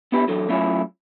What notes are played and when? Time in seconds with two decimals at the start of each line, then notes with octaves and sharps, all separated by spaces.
0.12 B3 D4 E4 G4 B4
0.28 E3 F#3 D4 A4
0.49 F#3 A3 C#4 E4 F4 G#4